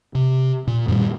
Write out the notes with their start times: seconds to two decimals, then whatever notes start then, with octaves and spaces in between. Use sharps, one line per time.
0.15 C3
0.67 A#2
0.88 F#2 A#2 D#3 G3